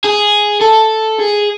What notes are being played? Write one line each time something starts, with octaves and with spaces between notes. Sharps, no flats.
G#4
A4
G#4